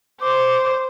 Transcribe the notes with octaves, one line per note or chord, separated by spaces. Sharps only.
C5 D6